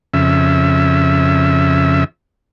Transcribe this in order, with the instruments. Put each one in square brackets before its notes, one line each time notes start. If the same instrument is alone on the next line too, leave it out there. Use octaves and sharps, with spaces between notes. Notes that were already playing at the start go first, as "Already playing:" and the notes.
[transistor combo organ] F2 C#3 E5